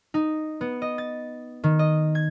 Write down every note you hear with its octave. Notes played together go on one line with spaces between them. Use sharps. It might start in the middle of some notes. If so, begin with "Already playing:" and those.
D#4
B3
D#5
A6
D#3
D#5
G#6